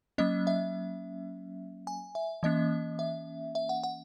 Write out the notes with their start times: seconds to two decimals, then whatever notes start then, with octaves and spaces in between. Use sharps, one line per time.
0.18 F#3 A#3 C#4 D#5
0.47 E5
1.87 G#5
2.15 E5
2.43 E3 A#3 C#4 D#5
2.99 E5
3.55 E5
3.69 F#5
3.84 F#5